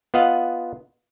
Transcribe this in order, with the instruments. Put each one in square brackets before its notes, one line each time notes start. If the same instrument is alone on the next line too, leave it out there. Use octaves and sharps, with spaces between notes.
[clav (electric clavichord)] B3 F4 D#5 F5 F#5